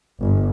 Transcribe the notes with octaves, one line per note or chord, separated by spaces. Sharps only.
G1